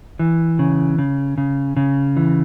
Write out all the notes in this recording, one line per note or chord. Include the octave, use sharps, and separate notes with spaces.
E3
C#3
C#3
C#3
C#3
E3